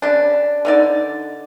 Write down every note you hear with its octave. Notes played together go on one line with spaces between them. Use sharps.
C#3 D4
D3 D#4 D5